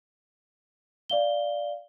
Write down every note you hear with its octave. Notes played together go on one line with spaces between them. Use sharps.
D5 F5 G7